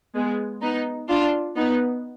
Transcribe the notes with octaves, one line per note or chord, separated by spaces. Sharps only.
G#3 B3
B3 D#4
D4 F4
B3 D#4